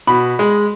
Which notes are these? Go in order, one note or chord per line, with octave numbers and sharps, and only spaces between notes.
B2 B5
G#3